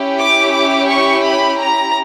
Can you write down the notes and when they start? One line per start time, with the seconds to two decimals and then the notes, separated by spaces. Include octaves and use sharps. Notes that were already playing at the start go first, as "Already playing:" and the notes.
Already playing: C#4 E4 G4
0.20 D6
0.54 D6
0.89 C#6
1.24 B5
1.60 A#5